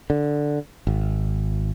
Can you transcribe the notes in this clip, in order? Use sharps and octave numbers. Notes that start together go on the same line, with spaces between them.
D3
G#1